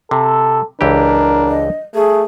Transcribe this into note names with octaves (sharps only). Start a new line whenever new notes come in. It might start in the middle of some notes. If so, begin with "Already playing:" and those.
C3 A4
C#2 E3 D4 G4 A#4
D#5
A3 G#4